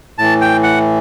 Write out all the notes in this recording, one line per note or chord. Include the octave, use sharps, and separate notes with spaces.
A2 E3 A5
G5
F#5